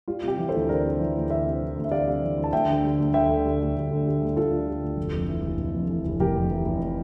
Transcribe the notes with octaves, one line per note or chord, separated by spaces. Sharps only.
G3 F4
C3 G4
E3
A4 C5
D2
G3 A#4 D5
C3
E3
D2
G3 C5 E5
C3
E3
D2
E5
G3 D5 F5
C3
E3
D2
A5
D2 E5 G5
D3
G3
D2
D2 E5 G5
D3
G3
D2
D2
D3
G3
D2
D2 F4 A4
D3
G3
D2
F1
F2
E3
F1
F1
F2
E3
F1
F1 G4 A#4
F2
E3
F1